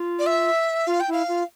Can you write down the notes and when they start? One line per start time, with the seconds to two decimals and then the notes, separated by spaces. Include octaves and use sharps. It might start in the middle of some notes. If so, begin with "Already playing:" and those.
Already playing: F4
0.19 D5
0.26 E5
0.87 F4 F5
1.00 G5
1.08 E4 F5
1.28 F4